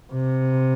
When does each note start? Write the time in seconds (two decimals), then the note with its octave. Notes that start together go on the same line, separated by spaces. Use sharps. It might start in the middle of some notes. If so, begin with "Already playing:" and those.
0.13 C3